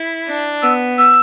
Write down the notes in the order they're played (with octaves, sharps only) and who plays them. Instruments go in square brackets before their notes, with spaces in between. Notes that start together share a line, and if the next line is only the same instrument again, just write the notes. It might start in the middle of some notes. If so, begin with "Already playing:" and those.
Already playing: [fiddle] E4
D4
[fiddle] B3 [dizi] E6
[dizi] E6